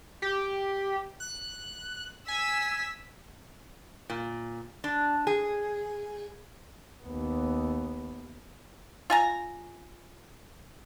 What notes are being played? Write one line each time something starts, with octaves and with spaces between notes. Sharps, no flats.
G4
F#6
G#5 E6 B6
A#2
D4
G#4
D#2 B3
F4 G#5 A#5